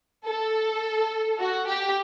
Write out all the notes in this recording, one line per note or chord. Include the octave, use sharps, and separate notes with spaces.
A4
F#4
G4